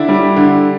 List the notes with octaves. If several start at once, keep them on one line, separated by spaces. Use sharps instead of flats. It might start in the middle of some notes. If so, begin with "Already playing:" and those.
Already playing: D3 D4 E4
G3
D3